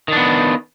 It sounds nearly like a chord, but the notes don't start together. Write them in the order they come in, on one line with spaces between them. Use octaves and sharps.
D#3 D4 B3